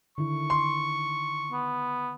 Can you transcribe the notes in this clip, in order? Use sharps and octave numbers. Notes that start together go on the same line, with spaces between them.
D3 D#3 E4 C#6
C6
B3